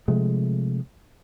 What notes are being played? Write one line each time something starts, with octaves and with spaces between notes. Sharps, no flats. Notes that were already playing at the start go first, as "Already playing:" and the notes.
C3 F3 G#3 A3